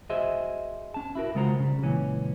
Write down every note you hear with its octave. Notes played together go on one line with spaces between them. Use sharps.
F#4 G#4 C5 D#5 E5
C#4 A5
E4 F#4 A#4
C#3 G#3 F4 F#4 C5 A#5
C#3 G3
C#2 A#2 E3 C#4